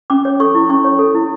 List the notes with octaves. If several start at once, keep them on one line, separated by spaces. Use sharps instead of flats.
C#4 D6
C#5
A4 C#6
E4
C#4 C#6
C#5
A4
E4